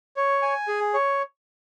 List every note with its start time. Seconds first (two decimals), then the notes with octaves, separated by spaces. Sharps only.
0.17 C#5
0.42 G#5
0.68 G#4
0.94 C#5